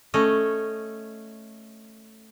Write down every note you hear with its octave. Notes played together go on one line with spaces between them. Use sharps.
A3 C#4 D#5